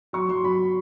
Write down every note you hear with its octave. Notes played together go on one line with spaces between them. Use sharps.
F#3 C#6
F#3 C6
F#3 B5